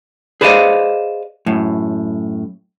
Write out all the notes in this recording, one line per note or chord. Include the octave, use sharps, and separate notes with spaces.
G#4 B4 C5 D5 D#5 F5
F#2 A2